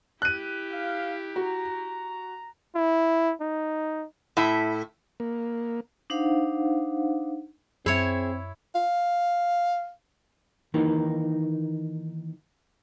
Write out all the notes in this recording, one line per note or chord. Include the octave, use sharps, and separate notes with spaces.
E4 G4 F#6 D#7
F5
F#4 A#5
E4
D#4
A2 E4
A#3
D4 D#4 C5 F5 F#5
F#2 C4 E4 G#4 C#5 E5
F5
D#3 E3 A#3 D#4